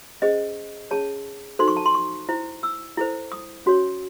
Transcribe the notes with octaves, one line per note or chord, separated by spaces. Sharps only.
C#4 G#4 C5 D#5
C#4 G#4 C#5 A5
D#4 F#4 A4 C5 C6
C#6
A5
C6
C#6
E4 C5
E6
E4 A4 C5
D#6
C#4 F#4 C#5